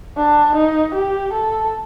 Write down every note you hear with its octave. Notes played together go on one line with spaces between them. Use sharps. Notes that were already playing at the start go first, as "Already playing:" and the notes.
D4
D#4
G4
A4